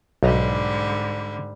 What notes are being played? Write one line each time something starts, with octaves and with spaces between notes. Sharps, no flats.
B1 G#2 D3 G3 A#5